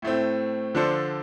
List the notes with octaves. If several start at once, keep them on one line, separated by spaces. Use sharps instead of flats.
A2 A3 C4
D3 F3 D4 A4 C5